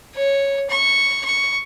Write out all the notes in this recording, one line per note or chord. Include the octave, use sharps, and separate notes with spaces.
C#5
C#6
C#6